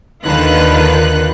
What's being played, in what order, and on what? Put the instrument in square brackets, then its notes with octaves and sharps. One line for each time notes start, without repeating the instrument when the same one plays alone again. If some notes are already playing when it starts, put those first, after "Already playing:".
[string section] D#2 D3 D#3 F4 B4 F#6